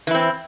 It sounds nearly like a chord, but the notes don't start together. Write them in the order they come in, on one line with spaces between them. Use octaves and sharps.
E3 E4 C4